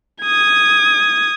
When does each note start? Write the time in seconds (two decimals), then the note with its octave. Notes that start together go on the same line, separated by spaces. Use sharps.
0.21 D#6 G#6